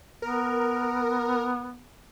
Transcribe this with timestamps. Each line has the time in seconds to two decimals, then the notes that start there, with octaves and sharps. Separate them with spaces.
0.22 B3 A#4